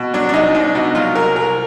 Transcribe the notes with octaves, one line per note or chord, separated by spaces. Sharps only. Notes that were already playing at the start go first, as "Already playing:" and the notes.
Already playing: B2
F#3 D4
D4
C2 D#4
C2 D4
B2 D#4
F#3 F4
C2 A#4
C2 A#4